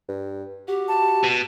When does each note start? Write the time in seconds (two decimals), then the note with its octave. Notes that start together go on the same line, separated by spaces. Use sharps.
0.08 G2
0.68 F#4 G4
0.88 A5
1.24 B2